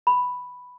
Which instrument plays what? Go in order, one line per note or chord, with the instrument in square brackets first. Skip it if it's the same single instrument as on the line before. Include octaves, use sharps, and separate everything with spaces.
[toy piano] B5